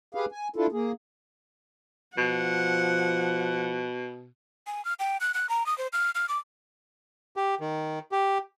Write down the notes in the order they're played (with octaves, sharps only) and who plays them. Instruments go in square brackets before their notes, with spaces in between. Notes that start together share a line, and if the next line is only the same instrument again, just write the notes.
[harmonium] G4 G#4 B4 F5
G#5
D4 E4 F4 A4
A#3 G#4
[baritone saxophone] B2 [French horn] F3 [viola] F#5
[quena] G#5
F6
G5
F#6
F#6
A#5
D#6
C5
F6
F6
D6
[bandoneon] G4
D#3
G4